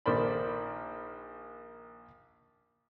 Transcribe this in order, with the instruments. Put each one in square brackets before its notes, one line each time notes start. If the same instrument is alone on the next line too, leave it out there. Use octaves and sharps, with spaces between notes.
[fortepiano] A#1 D#3 A#3 C5 D5 B5